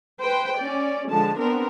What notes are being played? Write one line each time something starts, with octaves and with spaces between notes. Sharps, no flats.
B4 C5 G5
C#4 D5
D3 F3 G#3 A5
B3 C4 D4 A#4